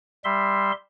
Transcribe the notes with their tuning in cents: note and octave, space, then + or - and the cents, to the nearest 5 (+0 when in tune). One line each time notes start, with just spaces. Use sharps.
G3 +10 E5 +0 C6 +0